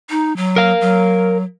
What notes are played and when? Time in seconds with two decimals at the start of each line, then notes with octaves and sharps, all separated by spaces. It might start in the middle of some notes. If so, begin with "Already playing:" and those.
0.10 D#4
0.37 F#3
0.56 A#4 F5
0.81 F#3